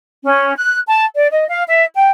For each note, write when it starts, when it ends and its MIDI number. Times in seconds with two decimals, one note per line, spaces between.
0.25 0.56 61
0.57 0.79 90
0.86 1.04 81
1.15 1.27 74
1.32 1.44 75
1.48 1.62 77
1.67 1.85 76
1.94 2.10 79